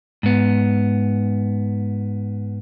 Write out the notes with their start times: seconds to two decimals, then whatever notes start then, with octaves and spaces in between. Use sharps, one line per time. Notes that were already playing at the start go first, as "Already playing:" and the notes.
0.23 G#2 B3